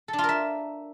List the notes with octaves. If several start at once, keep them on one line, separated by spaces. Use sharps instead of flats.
A4
D4
F4
A#4
E5